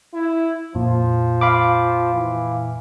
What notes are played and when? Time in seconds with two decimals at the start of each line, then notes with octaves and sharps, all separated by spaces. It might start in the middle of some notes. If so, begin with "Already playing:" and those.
0.14 E4
0.75 F2 A#2 F3
1.41 F5 B5 D6
2.14 E3